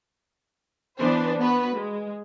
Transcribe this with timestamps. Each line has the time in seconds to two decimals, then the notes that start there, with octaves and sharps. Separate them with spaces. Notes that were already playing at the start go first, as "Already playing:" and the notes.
0.98 E3 B3 D4 B4 C5
1.38 B3 F#4 B4
1.75 G#3